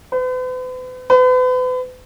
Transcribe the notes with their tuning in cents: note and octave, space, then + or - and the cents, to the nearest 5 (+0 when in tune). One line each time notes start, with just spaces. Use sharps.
B4 +45
B4 +40